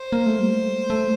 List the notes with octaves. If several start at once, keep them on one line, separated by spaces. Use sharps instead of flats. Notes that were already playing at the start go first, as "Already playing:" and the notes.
Already playing: C5
A#3
A3
G3
A3
A3